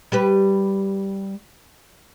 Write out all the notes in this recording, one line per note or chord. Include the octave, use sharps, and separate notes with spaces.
G3 G4 B4